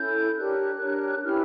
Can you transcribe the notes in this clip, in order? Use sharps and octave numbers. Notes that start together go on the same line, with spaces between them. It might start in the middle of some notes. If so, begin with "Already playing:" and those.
Already playing: C#4 E4 A4 G6
D4 G4 A#4 C#5 F#6
D4 G4 A#4 C#5
C#4 E4 G4 B4 F6